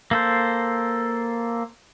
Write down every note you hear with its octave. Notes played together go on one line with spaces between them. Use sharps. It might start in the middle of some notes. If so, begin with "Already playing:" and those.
A#3 A4 C5